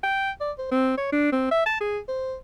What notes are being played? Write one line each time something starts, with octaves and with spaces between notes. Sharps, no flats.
G5
D5
C5
C4
C#5
D4
C4
E5
A5
G#4
C5